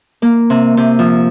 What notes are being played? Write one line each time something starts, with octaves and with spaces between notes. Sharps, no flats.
A#3
C3
C3
F3